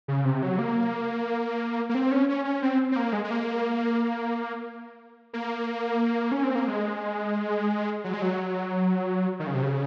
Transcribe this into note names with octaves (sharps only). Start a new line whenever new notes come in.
C#3
C3
F#3
A#3
A#3
C4
C#4
C#4
C#4
C4
C4
A#3
G#3
G#3
A#3
A#3
C#4
C4
A#3
G#3
F#3
G#3
F#3
D#3
C#3
C3
C#3